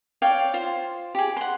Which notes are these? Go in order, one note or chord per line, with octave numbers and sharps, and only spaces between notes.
C#5 D5 F5 G5
F4 C5
G4 G#4
F#5 C6